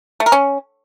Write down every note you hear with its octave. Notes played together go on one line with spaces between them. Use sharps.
A3
A#4
C#4